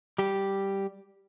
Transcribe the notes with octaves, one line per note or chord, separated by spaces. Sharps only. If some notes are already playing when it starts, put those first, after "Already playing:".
G3 G4